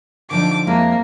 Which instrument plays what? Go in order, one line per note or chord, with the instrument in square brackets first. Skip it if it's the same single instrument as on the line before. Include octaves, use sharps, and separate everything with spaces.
[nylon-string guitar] D3 F3 D#4 [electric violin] D6
[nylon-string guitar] F2 G#3 E4 [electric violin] A#3